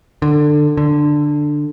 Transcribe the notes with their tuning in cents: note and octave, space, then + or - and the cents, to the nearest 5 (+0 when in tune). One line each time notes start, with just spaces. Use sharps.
D3 +20
D3 +10